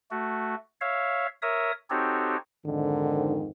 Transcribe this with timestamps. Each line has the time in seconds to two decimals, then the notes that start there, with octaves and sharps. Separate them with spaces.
0.11 A3 F#4
0.81 C#5 E5 F5
1.42 A#4 C#5 E5 D#6
1.90 C4 D#4 F#4 G4 A4 C#5
2.65 F2 G#2 D3 D#3